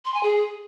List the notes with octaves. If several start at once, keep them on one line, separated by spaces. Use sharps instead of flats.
C6
G#5
G#4